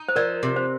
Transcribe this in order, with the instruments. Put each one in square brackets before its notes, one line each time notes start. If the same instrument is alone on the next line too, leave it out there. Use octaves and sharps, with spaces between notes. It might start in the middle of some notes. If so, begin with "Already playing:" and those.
Already playing: [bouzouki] D#4
[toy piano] C5
[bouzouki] F3 [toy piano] A#4 D5
[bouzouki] C3
[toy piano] C5